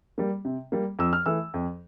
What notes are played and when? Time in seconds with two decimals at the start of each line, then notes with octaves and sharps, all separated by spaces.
0.18 G3 A#3
0.45 C3
0.72 G3 A#3
0.99 F2 E6
1.13 F6
1.26 E3 A3 E6
1.54 F2